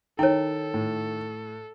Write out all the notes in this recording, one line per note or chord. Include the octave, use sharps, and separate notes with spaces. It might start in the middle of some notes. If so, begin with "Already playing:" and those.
D#3 E4 A4 C#5 G5
A2